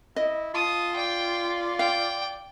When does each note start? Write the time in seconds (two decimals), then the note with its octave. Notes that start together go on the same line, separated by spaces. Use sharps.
0.16 E4 D#5
0.54 F4 A5 D#6
0.96 D5 G5
1.79 F5 G5